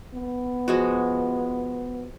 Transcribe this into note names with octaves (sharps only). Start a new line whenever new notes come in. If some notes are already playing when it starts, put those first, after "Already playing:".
B3
F3 G#3 F#4